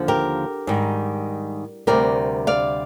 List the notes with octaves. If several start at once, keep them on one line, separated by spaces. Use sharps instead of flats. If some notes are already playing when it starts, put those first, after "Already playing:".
Already playing: D#2 D3 F3
G4 A#4
G#2 D#3 G3
D2 C3 G3 A#4 D5
D5 F5